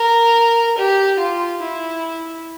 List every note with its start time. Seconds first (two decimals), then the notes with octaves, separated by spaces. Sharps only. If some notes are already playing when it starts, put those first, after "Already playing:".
Already playing: A#4
0.77 G4
1.20 F4
1.62 E4